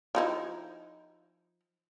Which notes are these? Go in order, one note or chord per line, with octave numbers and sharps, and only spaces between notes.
F3 D#4 E4